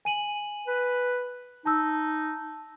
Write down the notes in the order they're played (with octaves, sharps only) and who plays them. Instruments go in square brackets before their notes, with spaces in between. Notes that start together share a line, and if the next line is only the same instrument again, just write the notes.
[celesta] G#5 D#7 F#7
[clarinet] B4
[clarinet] D#4 [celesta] A5 E6